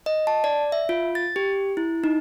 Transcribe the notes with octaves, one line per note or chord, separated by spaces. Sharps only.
D#5
A5
D5
E5
F4
A6
G4
E4
D#4